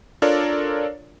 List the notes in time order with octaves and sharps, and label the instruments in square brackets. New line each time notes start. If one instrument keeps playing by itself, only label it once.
[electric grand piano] D4 F4 A4 A#4 C#5 D5